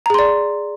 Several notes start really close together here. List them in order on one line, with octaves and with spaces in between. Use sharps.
A#5 G#4 C6 D5